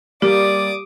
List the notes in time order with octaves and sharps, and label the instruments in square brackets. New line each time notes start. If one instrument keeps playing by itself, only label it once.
[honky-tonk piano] G3 A#3 [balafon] G4 [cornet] D5 [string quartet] D6 D#6